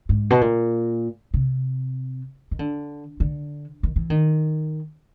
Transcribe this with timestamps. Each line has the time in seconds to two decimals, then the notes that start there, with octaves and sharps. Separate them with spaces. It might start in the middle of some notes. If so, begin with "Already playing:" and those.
0.09 G#2
0.30 B2
0.41 A#2
1.34 C3
2.51 D#3
2.59 D3
3.20 D3
3.83 D#3
3.96 E3
4.10 D#3